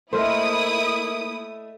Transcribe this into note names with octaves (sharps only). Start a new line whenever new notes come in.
A3 A#3 E4 A#4 C5 D#5 E5 D#6